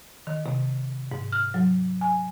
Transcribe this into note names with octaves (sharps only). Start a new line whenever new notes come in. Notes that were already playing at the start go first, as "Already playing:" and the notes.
D#3
C3
G#2
F6
F#3
G#5